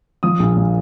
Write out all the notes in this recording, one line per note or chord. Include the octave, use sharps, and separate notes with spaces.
F3 D#6
A#1
A#2